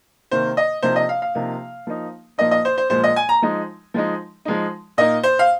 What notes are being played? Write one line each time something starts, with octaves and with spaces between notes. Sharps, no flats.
C3 D#3 A#3 C5
D#5
C3 F3 A#3 D#4 C5
D#5
F5
F5
C3 F3 A#3 D#4
F3 A#3 D#4
A#2 F3 A#3 D#4 D#5
D#5
C5
C5
A#2 F3 G#3 C5
D#5
G#5
A#5
F3 G#3 D#4
F3 G#3 D#4
F3 G#3 D#4
A#2 A#3 D#4 D#5
C5
F5